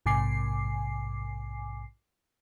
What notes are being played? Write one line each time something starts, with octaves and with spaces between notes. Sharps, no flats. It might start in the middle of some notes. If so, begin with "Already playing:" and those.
A#1 G#2 C3 G#5 D6 C7